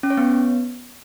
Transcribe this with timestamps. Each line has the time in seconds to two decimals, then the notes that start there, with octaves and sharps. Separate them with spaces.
0.03 C#4
0.10 C#5
0.17 B3